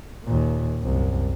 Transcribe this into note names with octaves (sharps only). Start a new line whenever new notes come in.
D#2 A#2
C2 F#2